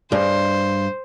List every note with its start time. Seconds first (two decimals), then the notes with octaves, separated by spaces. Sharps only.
0.12 G2 G#4 C5